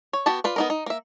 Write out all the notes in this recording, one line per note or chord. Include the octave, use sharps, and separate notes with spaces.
C#5
B3 F#4 G4 A5
F4 B4 D5
B3 D#4 A#4
D#4
A#3 E5